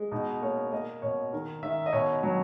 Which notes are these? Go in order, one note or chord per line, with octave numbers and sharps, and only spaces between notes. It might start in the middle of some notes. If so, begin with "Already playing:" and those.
Already playing: G#3
B2 D#4
A#3 C#5
A#3 D#5
B2 C#5
D#3 A#4
D#3 E5
D#5
B2 C#5
F#3